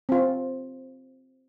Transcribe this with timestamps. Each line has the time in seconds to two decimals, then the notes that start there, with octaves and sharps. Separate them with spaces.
0.09 C4 F4